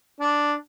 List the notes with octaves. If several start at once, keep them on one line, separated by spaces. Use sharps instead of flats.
D4